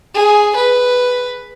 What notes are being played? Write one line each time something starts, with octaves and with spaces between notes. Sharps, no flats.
G#4
B4